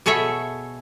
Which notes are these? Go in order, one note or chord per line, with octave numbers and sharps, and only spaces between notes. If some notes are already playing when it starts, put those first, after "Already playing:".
B2 G#4 A4 C#5 E5